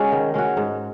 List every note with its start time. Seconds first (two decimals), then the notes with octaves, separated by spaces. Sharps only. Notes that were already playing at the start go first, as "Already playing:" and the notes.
Already playing: G#3 C#4 F#4
0.12 D#3
0.34 G#3 C#4 F#4
0.57 G#2